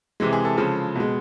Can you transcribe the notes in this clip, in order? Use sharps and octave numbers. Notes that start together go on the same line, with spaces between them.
C3 E3 G#3
G#4
A4
C#3 F3 G#3 A4
B2 G#3